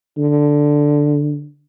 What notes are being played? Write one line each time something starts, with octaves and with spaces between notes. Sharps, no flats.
D3